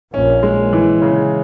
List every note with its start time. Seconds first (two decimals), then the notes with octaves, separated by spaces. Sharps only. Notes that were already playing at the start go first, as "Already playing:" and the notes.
0.14 A#1 A#2 C#4
0.43 G#3
0.73 E3
1.02 C#3